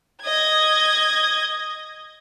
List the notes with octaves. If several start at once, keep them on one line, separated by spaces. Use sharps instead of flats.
D#5 G#6